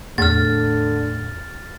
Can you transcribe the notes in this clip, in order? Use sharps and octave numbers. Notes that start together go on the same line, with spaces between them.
E2 A2 D3 F6 A6